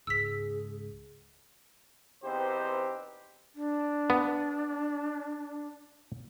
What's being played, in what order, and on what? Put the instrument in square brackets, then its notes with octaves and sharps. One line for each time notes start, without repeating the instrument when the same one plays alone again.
[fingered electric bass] C#2 G#2 [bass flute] G#4 [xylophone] E6 B6
[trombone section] E2 C4 D#4 G4 B4 C5
[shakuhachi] D4
[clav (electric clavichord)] B3